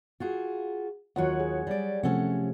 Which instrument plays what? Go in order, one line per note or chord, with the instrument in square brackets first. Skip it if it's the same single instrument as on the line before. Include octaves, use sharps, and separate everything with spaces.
[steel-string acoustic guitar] F4 F#4 G#4
[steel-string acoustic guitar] D#2 F4 F#4 [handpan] F#3 C#5 F#5
[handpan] G#4
[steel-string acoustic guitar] G3 D5
[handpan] C3 F3 A3 [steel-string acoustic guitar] C#4 A4 F#5